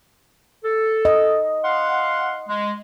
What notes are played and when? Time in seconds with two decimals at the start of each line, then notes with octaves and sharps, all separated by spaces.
0.64 A4
1.05 D#5
1.64 F5 F#5 C6
2.48 G#3